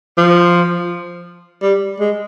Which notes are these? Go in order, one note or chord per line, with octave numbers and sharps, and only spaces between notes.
F3
G3
G#3